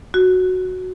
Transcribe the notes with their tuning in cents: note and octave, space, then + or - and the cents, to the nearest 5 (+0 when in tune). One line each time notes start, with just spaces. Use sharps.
F#4 -5